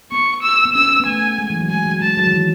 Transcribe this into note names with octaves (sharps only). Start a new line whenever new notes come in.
B3 C#6
E6
B3
C#4 E6
B3
A3 G#5
G#3
E3
F#3
G#3 G#5
F#3
G#3 A5
F#3
D#3
E3